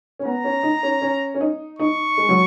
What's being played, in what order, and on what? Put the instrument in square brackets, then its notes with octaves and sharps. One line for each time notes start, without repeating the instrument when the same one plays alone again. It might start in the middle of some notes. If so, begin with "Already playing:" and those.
[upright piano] C#4
[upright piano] B3 [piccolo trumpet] A#5
[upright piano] C#4
D#4
C#4
C#4
C#4
D#4
[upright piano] D#4 [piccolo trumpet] C#6
[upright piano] G#3
F#3